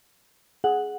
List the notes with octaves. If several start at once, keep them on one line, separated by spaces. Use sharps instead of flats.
G#4 F#5